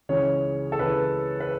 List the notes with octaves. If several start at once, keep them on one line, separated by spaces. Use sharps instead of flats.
C#2 C#3 E3 C#5
A4
C#2 C#3 E3 B4
B4